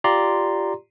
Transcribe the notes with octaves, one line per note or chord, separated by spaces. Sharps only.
F4 G4 D5 A#5 C6